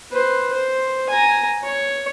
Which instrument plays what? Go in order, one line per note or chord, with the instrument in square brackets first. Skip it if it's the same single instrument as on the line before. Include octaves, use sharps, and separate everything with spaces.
[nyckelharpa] B4 C5
C5
G#5 A#5
C#5